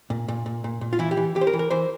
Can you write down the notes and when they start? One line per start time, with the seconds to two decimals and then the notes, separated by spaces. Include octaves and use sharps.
0.10 A#2
0.28 A#2
0.46 A#2
0.64 A#2
0.81 A#2
0.93 F4
0.99 E3 E4
1.11 G4
1.17 E3
1.35 E3 G4
1.41 C5
1.47 A#4
1.53 E3
1.59 A#4
1.71 E3 C5